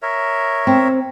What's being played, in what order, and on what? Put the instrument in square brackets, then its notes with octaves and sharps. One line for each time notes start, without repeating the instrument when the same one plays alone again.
[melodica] A#4 C#5 E5
[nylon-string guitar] C4